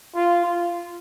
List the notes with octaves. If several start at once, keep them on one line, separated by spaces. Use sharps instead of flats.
F4
F4